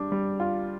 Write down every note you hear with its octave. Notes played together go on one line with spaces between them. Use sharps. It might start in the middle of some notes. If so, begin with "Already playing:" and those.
Already playing: G3 D4
G3
F4